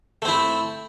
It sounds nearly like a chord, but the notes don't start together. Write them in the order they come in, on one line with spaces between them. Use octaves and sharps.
A3 C4 E4